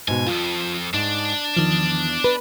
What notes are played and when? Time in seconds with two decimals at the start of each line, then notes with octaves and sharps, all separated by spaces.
0.08 G#2 B2 G#5
0.27 C2 F2 F4
0.94 G#2 D4
1.56 E2 D#3 F3
2.24 B4